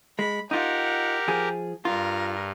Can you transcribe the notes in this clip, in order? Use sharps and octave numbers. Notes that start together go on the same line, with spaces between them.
G#3 B5
D#4 F4 G4 A#4 F#5
F3 G#4
G2 F4 A#4